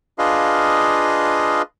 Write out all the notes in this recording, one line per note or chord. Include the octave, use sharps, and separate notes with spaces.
D4 F4 G#4 B4 D#5 F5